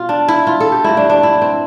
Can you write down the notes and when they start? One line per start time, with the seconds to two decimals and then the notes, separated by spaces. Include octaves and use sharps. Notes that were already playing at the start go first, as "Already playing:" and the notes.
Already playing: B2 F4
0.09 D4
0.28 E4
0.47 F4
0.60 A4
0.72 G4
0.84 G2 F3 A3 E4
0.97 D4
1.10 D4
1.23 E4
1.42 C4